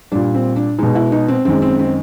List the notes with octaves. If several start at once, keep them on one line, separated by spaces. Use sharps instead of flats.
A#2 G3 D4
C4
D4
B2 G#3 D#4
E4
D#4
C4
F#2 D#3 G#3 C4
C4
C4